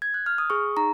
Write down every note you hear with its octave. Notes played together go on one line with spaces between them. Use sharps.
G#6
F#6
F6
D#6
G#4 C#6
D#4 A#5